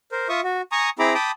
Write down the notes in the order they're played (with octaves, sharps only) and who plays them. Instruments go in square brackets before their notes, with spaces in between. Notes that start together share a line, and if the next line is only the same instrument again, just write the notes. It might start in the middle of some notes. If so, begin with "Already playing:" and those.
[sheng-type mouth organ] A#4 C5
F4 E5 C#6 D#6
F#4
G#5 A#5 C#6 D#6
C4 E4 G#4 A#5 B5 D6
G5 A5 B5 D6 D#6